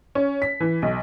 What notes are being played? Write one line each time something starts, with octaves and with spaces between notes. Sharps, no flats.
C#4
B6
E3
B1